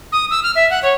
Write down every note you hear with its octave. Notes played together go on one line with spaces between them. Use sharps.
D#6
E6
F6
E5
F#5
C#5